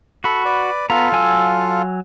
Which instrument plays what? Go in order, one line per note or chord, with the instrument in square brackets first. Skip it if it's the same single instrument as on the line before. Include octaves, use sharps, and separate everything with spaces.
[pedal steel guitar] F#4 B5 [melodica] A4 F#5
[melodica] B4 D5
[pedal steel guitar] B3 A#5 [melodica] F4 A4 F5
[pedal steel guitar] F#3 G#5 E6